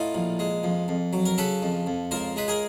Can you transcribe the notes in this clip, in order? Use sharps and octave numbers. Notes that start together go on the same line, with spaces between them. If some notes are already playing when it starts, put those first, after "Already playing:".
Already playing: A2 D#4 F4
A#1
G#3
F2
F2
F#3
A#4
C#3 A4 B4
F2
F2
C#2 A#4 C5
G#3 B4
G#4 A#4